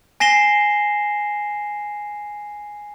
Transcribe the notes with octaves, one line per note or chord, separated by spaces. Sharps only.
G#5 A#6 C7 E7 G7